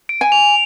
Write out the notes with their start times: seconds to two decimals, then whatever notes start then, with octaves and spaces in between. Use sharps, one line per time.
0.09 D7
0.21 G#5
0.32 F7